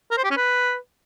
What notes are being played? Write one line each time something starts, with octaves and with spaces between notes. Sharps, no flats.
A#4
C5
G4
C#4
B4